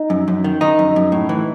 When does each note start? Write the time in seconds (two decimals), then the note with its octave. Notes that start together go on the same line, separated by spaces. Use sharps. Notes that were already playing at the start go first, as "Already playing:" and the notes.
Already playing: D#4
0.10 F#2
0.28 F#2
0.44 D#3
0.61 D#3 D#4
0.79 F#2
0.96 F#2
1.12 A2
1.29 E3